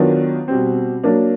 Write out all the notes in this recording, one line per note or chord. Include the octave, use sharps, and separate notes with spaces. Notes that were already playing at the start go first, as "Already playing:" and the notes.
Already playing: D#3 F#3 B3 D4 F4
B2 G3 C4
F#3 A#3 D4